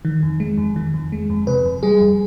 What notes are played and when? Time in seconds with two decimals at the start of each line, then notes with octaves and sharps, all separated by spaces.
0.05 D#3
0.23 F2
0.40 G#3
0.58 F2
0.76 D#3
0.94 F2
1.12 G#3
1.30 F2
1.47 C3 B4
1.65 F2
1.83 G3 G#4
2.01 F2